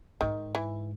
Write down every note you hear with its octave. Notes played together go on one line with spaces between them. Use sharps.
G#2 D#3
E3